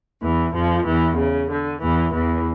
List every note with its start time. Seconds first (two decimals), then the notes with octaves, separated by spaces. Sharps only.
0.22 E2 E3
0.53 F2 F3
0.85 E2 E3
1.17 C#3
1.49 D3
1.80 E2 E3
2.12 E2 E3